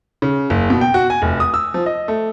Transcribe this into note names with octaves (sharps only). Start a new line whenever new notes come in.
C#3
F#1
B2
G5
F#4
G#5
F1
D#6
E6
F3
D#5
A3